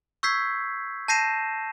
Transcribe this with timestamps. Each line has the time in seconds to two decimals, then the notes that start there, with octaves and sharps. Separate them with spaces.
0.23 C#6 E6 G6 G#6 B6 C7
1.08 A5 G6 A#6 C7 D#7 E7